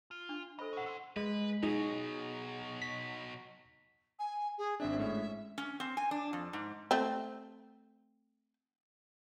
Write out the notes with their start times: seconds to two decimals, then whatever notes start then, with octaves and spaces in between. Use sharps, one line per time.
0.11 F4
0.29 D4
0.59 A4 C5 D#5 B5
0.73 C#4 E4 C5 F#5
0.86 A4 C6
1.16 G#3 B4
1.63 B2 F#3 D#4 G#4
2.82 B6
4.19 G#5
4.58 G#4
4.80 G#1 C4 D4 E5
4.99 A2 G#3 C#4 E5
5.58 C#4
5.80 C4
5.97 G#5
6.11 D4
6.33 F2
6.53 G#2
6.91 A3 C4